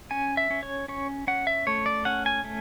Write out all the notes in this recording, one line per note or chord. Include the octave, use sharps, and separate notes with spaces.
C#4 G#5
E5
C#4
C#5
C#4 C#5
C#4 F#5
E5
A3 C#5
D5
C#4 F#5
G#5
A3